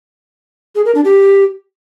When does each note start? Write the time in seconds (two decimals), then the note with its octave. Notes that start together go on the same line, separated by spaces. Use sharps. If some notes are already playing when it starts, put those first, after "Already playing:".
0.75 G#4
0.85 A#4
0.95 D4
1.05 G4